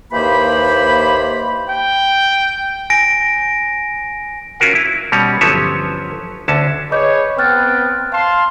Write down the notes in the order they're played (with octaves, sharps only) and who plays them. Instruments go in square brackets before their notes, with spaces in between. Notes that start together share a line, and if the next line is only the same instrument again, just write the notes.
[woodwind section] D#2 E3 A#3 G4 C5 B5
[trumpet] G5
[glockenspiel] G#5 A#6 D7
[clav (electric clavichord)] C#4 F4 F#4 A#4 F#5
E4
B2 G3 C#4 A#5
G1 F3 F#3 C#4 C#5 E5
D2 D3 C#4 A5
[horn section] G#4 B4 C#5 [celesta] D#5 D6 G6
[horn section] B3 C4 G5 [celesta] F6 F#6 A6
[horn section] F5 A5 C6